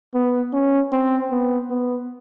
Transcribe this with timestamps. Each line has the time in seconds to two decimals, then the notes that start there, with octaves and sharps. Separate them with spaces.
0.14 B3
0.53 C#4
0.92 C4
1.31 B3
1.70 B3